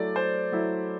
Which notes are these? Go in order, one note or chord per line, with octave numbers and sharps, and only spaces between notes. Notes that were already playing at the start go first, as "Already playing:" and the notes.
Already playing: F#3 A3 E4 D5
C5
F#3 A3 E4